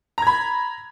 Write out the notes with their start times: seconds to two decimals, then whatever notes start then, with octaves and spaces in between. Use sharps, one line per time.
0.18 A#5
0.22 G#6
0.27 B5